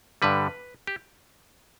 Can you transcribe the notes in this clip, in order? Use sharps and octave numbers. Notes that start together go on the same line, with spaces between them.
G2 D3 G3 B4
G4